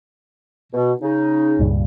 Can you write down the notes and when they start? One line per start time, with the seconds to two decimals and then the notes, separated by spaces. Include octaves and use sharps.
0.73 B2
1.01 C#3 D#4
1.59 C#2 G2 A#2